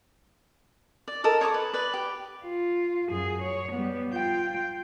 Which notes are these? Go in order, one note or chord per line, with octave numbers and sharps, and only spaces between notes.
D5
A4 A#4 D#5
C#5 D#5 C#6 D6
B4
B4 D5
G4
F4
F#2 G#4
C#5
G3 B3
F4 G5